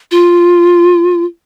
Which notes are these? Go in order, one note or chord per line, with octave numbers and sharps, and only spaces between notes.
F4